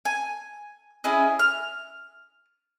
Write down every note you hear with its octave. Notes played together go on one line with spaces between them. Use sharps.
G#5
C#4 E4 G#4 D#5
F6